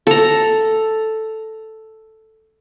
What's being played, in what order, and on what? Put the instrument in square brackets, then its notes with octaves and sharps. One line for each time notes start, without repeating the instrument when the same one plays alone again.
[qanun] A4 A#5